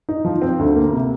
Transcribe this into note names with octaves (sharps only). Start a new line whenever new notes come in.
D#4
F3
C4
D2
A#3
C3